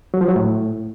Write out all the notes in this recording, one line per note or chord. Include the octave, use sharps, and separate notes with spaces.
F#3
F3
F#3
A2